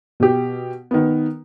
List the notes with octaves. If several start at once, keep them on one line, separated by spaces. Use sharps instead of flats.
B2 G4
D#3 B3